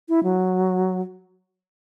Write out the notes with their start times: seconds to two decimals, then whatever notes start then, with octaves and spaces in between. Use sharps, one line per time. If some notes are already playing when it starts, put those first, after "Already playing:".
0.09 E4
0.24 F#3